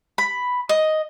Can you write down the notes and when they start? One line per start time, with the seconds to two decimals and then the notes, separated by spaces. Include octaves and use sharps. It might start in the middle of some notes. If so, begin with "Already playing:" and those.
0.18 B5
0.69 D#5